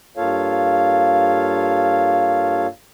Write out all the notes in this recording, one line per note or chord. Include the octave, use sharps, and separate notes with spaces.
G2 A#3 F4 A4 C#5 F5